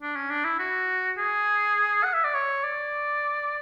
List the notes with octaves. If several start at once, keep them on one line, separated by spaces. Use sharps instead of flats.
D4
C#4
D4
E4
F#4
G#4
F#5
E5
D5
C#5
D5